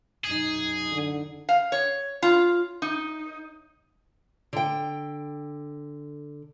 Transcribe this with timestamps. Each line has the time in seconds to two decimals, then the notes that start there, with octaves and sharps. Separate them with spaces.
0.24 F#2 D#4 G#4
0.92 D3
1.49 F5
1.72 C#5
2.22 F4
2.82 D#4
4.53 D3 G5